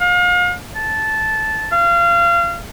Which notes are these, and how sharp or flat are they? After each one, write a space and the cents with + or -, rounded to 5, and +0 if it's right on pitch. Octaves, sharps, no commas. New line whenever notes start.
F5 +40
A5 -10
F5 -25